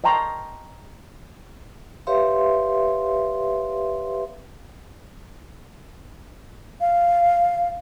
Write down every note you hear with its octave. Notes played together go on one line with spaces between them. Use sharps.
D#5 G5 A5 A#5 C6 C#6
G4 B4 C#5 E5 F5 C6
F5